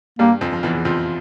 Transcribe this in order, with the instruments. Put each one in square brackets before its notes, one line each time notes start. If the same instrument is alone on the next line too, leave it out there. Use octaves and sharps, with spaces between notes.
[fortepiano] G2 G3 [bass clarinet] A#3
[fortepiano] F2 F3
F3
E2 E3
F2 F3